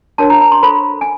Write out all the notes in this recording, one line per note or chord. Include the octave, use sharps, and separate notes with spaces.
D4 F#4 A#4 C#5 A5
A#5
A#5
C6
F4 A4 C5 B5
G#5